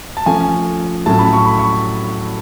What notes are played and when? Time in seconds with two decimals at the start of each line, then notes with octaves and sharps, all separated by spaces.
0.17 A5
0.26 F3 A3 C#4 G#5
1.06 A2 F#3 A3 C#4 A5
1.19 B5
1.33 C#6
1.46 B5
1.59 C#6